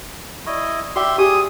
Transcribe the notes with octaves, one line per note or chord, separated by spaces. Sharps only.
E4 D5 D#5 C#6
F#4 G4 D5 E5 G5 C6
G4 G#4 D6 D#6